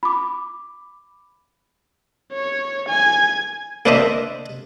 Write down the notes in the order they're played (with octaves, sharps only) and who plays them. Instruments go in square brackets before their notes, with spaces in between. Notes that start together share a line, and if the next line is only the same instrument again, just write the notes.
[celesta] B5 D6
[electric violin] C#5
G#5
[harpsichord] A#3 D4 B4 C5 D#5 E5